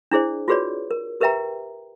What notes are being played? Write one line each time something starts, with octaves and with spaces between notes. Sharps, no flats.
D4 E4 G#4 C5 D5
F4 F#4 G#4 B4 C#5 D5
A#4
G4 A#4 B4 E5 G5 A#5